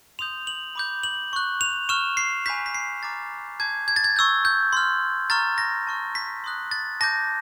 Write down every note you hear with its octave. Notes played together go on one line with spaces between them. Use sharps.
C6 D#6 G6 F7
F#7
B5 D6 G6
F#7
C#6 F#6
F7
C#6 F6 E7
C7
G#5 B5 D6 G6 B6
B6
C7
A#5 D6 F6 A6
A5 D6 G6 G#6
G#6
A6
G#6
C#6 E6 G6
G6
C6 F6
A#5 C#6 F6 A6
A#6
A5 C#6 F6
B6
C6 D#6 F#6
A6
A5 D6 G6 A#6